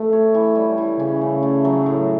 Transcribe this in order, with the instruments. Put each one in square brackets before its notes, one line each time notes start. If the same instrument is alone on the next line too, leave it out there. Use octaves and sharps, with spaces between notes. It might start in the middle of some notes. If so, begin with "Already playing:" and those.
Already playing: [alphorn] A3
[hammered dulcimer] C#5
E3
G3
E3
[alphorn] C#3 [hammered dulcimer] C#4
[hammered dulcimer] A3
A3
F#3
A2